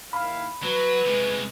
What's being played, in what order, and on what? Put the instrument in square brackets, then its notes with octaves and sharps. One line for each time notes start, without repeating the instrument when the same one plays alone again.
[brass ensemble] D#2 E4 F5 [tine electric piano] B5
[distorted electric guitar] F#3 [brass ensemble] B4
[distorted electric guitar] C3 G#3